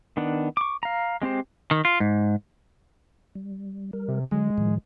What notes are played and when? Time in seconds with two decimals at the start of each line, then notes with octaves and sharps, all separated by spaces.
0.17 D#3 B3 D4
0.57 C#6 D6
0.83 F5 A#5
1.22 G#3 C4 G4 C5
1.71 D#3
1.85 F4
2.00 G#2
3.35 G3
3.93 G3 A#4
4.08 C3
4.31 D3 F#3 G#3
4.58 A2 D#3 F3